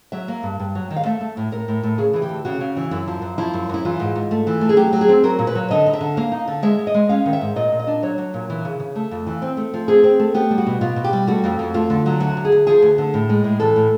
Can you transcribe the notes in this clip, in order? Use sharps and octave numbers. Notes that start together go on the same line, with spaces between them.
F#3 E5
A#3
G2
G2
F#3
D#3
F5
A3 E5
A3
A2
A2 A#4
A2
A2
C#3 G#4
E3 G#4
G4
D2
C#3 F#4
C#3
E3
F#2 E4
F3
F#2
F3 E4
F#2
F#2 E4
E3 F4
G#2
G#2
A3
E3
A3
G#4
F#3 G4
F#3
G#4
C4
F#3 A#4
A#2
B4
F#3
D3 D#5
D#4
E5
D3
A#3 F5
D#4
D3
G#3 E5
G#3
D#5
G#3
C#4 F5
D#3
E5
G#2
A#2 D#5
A#2
D#5
D4
F#3 C#5
F#3
A#2
E3
C#3
C#3
A3
F2
E3
C4
A3
F3
C4 G#4
C4
A3
B3 G4
G3
F#4
B2
B2 F4
B2
G4
G3
A3 F#4
F2
F2
A3 F4
D3
F#3
D2 F#4
D2
G#4
D2
F3 G#4
D2
D3
A2
G#3
A2
E3 A4
A2